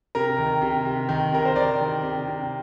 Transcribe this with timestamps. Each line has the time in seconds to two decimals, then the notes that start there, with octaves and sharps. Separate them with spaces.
0.15 C3 A#4
0.38 D#3
0.62 C3
0.85 C3
1.09 D#3
1.32 C3 A#4
1.45 C5
1.56 D#3 D5
1.80 D#3
2.03 C3
2.27 C3